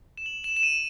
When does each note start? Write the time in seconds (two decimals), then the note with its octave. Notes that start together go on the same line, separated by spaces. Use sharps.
0.17 E7
0.26 F#7
0.44 E7
0.56 E7
0.63 D#7